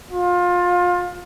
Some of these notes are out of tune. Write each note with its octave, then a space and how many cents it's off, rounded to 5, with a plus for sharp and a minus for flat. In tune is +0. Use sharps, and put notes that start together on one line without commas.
F4 +25